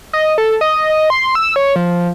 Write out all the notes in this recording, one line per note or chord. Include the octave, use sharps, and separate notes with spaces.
D#5
A4
D#5
D#5
C6
E6
C#5
F3